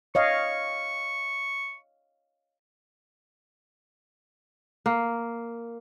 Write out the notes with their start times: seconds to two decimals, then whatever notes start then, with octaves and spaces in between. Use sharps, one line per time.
0.15 C#5 D#5 F5 C#6
4.86 A#3